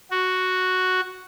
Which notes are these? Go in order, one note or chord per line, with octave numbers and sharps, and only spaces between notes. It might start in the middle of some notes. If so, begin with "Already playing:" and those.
F#4